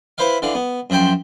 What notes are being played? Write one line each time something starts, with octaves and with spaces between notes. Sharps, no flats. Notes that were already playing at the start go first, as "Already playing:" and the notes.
E4 B4 C5 E5 F5
D3 E3 F5
B3
F#2 F3 E5 G5 C6